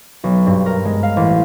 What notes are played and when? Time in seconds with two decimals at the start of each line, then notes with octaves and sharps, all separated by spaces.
0.24 B1
0.47 G2
0.66 A#4
0.85 G#3
1.03 F5
1.16 A1